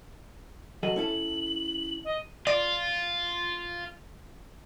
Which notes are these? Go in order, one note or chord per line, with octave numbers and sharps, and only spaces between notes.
F#3 A4 D#5 F#7
C#4 E4 A4
D#5
F4 D5